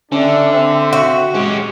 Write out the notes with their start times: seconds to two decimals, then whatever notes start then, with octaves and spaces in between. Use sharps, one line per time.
0.12 D3 C#4 D4 G4 E5
0.53 C4 E5
0.93 F#4
1.34 G#3 C#4 G4